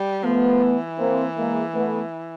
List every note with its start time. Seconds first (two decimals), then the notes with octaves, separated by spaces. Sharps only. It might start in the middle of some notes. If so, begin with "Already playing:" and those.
Already playing: G3
0.23 F3 A3 B3
0.62 E3
0.99 A#3 C4
1.37 G#3 A#3
1.74 A3 B3